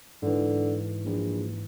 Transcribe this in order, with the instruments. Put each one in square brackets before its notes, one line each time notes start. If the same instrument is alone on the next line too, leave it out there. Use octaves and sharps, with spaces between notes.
[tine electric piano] G#2 E3 [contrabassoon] D3
[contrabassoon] A#1